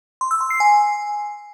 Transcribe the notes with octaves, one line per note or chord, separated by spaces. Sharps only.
C6
E6
C6
C7
G#5